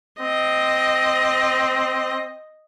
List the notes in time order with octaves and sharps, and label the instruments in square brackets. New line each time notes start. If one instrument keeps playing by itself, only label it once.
[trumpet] C4 [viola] D#5